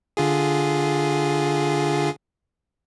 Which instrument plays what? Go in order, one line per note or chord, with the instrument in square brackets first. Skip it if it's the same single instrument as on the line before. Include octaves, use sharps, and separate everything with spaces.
[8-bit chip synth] D3 F4 G#4